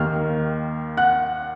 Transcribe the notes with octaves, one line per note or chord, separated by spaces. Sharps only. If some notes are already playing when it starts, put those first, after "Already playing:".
Already playing: D#2 D#3 A#3 F6
F#5 F#6